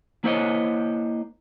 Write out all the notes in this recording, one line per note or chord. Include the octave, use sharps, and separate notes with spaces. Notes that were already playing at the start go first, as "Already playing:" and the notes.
A#3 E4 C5 C#5 D#5